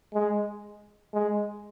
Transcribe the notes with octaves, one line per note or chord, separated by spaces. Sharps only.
G#3
G#3